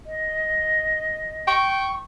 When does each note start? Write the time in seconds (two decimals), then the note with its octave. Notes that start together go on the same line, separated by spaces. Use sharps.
0.06 D#5
1.47 G5 C#6